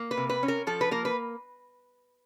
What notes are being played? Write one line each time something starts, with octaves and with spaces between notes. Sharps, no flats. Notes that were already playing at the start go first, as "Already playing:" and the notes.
Already playing: A#3
B4
C3
B4
C#4
A#4
F3 A4
B4
A#3 A#4
B4